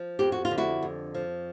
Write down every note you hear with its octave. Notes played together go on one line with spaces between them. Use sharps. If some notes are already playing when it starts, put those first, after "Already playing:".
Already playing: F3
F2 G4
F#4
F4
D3
E4 F#4
F2
F3